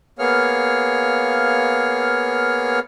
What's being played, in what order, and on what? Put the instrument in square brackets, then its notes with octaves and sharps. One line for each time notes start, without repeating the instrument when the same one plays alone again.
[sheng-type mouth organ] A#3 B3 G#4 C#5 F5 F6